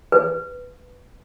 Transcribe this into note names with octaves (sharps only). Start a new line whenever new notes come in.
B4